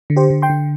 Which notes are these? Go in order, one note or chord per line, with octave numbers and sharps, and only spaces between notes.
D3
G4 C5
D3
G5 C6
D3